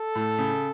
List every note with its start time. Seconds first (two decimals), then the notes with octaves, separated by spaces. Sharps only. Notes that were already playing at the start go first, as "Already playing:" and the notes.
Already playing: A4
0.15 A2
0.38 C#3